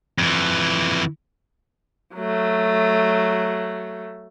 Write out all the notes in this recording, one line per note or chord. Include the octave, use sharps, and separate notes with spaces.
F2 E3
F#3 A3